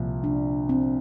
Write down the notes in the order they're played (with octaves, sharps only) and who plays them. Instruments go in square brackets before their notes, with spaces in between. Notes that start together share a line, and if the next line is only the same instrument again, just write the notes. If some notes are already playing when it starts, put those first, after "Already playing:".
Already playing: [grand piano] C2 A#2 F3
[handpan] D4
C4